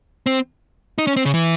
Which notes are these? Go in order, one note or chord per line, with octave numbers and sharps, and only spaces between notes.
C4
D#4
C#4
C4
C#3
E3